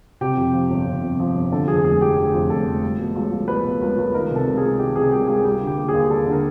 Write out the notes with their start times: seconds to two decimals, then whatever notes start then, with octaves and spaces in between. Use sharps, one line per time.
0.21 C3 G4
0.37 F2
0.54 F3
0.71 G1
0.87 C3
1.03 F2
1.20 F3
1.35 G1
1.52 D3 A4
1.68 F2 G#4
1.84 F1 G#4
2.01 F1 G4
2.17 D3 G#4
2.34 F2
2.50 F1 A4
2.67 F1
2.83 G3
2.99 B2
3.16 C#2
3.31 C#2
3.48 G3 B4
3.65 B2
3.81 C#2 A#4
3.98 C#2
4.14 D#3 A#4
4.31 C3
4.36 A4
4.47 G3
4.57 G#4
4.63 C#2
4.79 D#3 G4
4.96 C3 G#4
5.12 G3 G4
5.28 C#2 G#4
5.45 G3 G4
5.61 D3
5.67 G4
5.78 A#3
5.89 G#4
5.94 D#2
6.10 G3 A4
6.26 D3
6.32 A#4